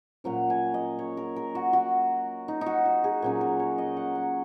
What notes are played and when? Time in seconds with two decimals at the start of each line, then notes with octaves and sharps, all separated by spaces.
0.24 A#2 F#3 C#4 A#5
0.50 G#5
0.74 D#5
0.99 C#5
1.17 A#4
1.36 A#4
1.55 F#4
1.73 F#4
2.48 D#4
2.61 D#4
2.66 F#4
2.86 F#4
3.04 G#4
3.22 A#2 F#3 C#4 G#4
3.41 A#4
3.59 C#5
3.78 D#5
3.97 F#5
4.15 F#5